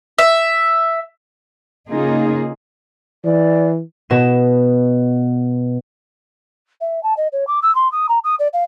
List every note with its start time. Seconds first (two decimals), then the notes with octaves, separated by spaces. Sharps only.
0.18 E5
1.89 C#3 A#3 D#4 F4 G#4
3.25 E3 D5
4.10 B2 E7
6.81 E5
7.03 A5
7.17 D#5
7.32 C#5
7.47 D6
7.62 E6
7.75 C6
7.92 D#6
8.09 A#5
8.24 D#6
8.39 D5
8.53 F5